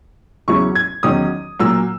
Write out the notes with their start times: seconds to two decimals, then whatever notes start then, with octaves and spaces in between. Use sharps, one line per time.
0.48 E2 C#3 F#3 C#4 E4 C#6
0.75 G#6
1.03 E2 D#3 F#3 C#4 D#6
1.59 A#2 F#3 A#3 E6